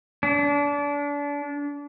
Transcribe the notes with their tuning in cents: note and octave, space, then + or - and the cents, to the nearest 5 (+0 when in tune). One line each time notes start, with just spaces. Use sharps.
D4 -30